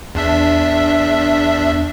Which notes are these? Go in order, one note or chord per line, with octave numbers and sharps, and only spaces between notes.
E2 D4 E5